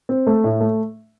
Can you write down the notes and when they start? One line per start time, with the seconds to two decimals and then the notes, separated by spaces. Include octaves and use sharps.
0.09 C4
0.27 A3
0.44 A2
0.60 A3